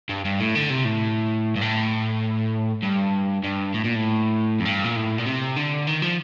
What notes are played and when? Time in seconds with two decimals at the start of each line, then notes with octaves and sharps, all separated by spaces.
0.09 G2
0.25 G2
0.40 A2
0.55 D3
0.70 C3
0.85 A2
1.56 G2
1.61 A2
2.83 G2
3.44 G2
3.74 A2
3.84 A#2
3.95 A2
4.60 F2
4.65 G2
4.84 A#2
4.96 A2
5.18 A#2
5.26 C3
5.56 D3
5.87 D#3
6.02 F3